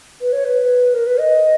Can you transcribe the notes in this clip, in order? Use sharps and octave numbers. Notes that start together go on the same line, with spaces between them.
B4
C#5
B4
A#4
B4
D#5